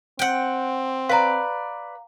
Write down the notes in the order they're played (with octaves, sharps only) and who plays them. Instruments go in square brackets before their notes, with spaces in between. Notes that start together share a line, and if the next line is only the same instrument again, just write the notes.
[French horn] C4 [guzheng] F#5 G5
[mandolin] B4 D5 [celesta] F5 A#5